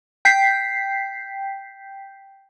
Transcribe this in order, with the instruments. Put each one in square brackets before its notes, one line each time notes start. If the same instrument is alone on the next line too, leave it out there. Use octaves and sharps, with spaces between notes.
[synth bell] G5 G6 B6 C7